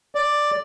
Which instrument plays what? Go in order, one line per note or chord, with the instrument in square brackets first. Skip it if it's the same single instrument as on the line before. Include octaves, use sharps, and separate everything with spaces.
[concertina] D5